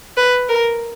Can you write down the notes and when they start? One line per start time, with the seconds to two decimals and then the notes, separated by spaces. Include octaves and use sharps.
0.17 B4
0.48 A#4